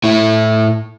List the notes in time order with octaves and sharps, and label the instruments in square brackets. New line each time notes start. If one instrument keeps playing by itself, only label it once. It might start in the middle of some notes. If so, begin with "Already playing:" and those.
[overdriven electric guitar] A2 E4